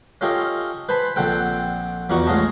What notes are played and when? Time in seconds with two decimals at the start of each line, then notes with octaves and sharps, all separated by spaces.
0.21 C#4 F4 G4 A4 C#5 D#5
0.89 B4 C5 G#5 A5 B5
1.16 A#1 D3 C4 A4 F#5 G5
2.10 E2 F3 D#4 F#4 D5 C#6
2.27 A1 G#3 C#4 F4 D#5 A5